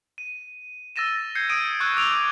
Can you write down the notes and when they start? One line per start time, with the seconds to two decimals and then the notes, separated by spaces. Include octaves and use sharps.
0.18 D#7
0.96 E6 A6 A#6 D#7 E7
1.35 G6 G#6 C7 C#7
1.49 D#6 D7 D#7
1.80 C#6 E6 F#6 G#6 D#7
1.97 D6 E6 D7 F7